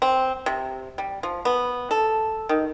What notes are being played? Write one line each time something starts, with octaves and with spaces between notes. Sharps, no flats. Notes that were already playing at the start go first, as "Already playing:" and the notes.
C4
C3
G3
F3
B3
A4
D#3